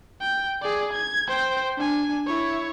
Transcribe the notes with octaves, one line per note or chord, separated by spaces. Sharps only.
G5
G#4 D5
G#6
C5 G5
D4 G#5
E4 C#5